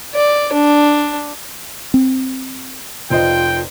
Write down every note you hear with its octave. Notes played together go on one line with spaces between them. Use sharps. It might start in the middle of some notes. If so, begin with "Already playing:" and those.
D5
D4
C4
F1 F4 C5 D#5 G5